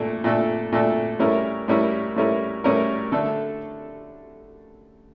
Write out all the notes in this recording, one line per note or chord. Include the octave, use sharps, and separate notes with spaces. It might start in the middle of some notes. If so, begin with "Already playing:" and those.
Already playing: A#2 A3 D4 A4
A#2 A3 D4 A4
A#2 A3 D4 A4
A2 G3 C#4 E4 A#4
A2 G3 C#4 E4 A#4
A2 G3 C#4 E4 A#4
A2 G3 C#4 E4 A#4
D3 A3 D4 A4